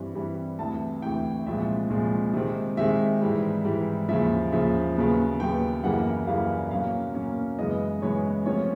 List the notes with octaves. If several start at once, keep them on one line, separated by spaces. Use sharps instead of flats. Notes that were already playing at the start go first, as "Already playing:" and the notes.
Already playing: G2 E3 G3 C4
G2 E3 G3 C4
D2 C3 E3 A5
D2 C3 E3 G5
C2 A#2 F3 G#3 E5
C2 A#2 F3 G#3
C3 D#3 G#3 C4
C3 D#3 G#3 C4 E5
G#2 E3 G3
G#2 E3 G3
D#2 C#3 F3 E5
D#2 C#3 F3 E5
D#2 C#3 F#3 B3
D#2 C#3 F#3 B3 G5
F#2 C#3 E3 G3 A#3 F#5
F#2 C#3 E3 G3 A#3 F5
B2 F#3 A#3 C#4 F5
B2 F#3 A#3 C#4
F#2 C#3 E3 G#3 B3 D#5
F#2 C#3 E3 G#3 B3 C#5
C3 F3 A3 C#4 C#5